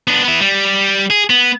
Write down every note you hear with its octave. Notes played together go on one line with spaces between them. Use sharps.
B3 D4
B3 E4
G3
G#4
B3